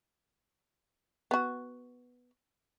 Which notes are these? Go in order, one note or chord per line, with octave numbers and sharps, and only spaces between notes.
B3 F#4